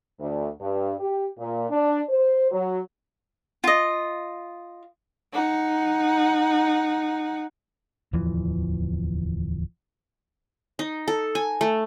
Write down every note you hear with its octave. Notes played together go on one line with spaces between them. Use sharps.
D2
G2
G4
A#2
D4
C5
F#3
F4 D#5
D#4 F#5
D1 E2 E3 F3
D#4
A4
G#5
A3